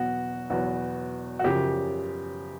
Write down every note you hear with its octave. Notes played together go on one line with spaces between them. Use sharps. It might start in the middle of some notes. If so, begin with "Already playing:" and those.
Already playing: E2 B2 F#3 B3 F#4
E2 B2 F#3 B3 F#4
F#4
F#2 C#3 F3 G4